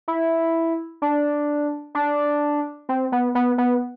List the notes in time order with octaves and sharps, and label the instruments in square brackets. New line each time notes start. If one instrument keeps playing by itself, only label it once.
[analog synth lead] E4
D4
D4
C4
B3
B3
B3